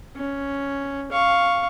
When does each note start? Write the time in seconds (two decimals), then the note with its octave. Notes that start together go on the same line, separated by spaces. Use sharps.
0.16 C#4
1.11 F5 C#6